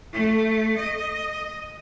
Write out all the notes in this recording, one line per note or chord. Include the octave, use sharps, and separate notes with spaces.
A3
D#5